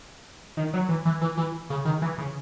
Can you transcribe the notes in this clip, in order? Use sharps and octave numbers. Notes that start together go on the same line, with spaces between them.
D#3
F#3
E3
E3
E3
E3
C#3
D#3
E3
C#3